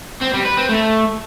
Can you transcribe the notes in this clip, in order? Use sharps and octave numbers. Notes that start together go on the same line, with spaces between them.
C4
G3
B4
C4
A3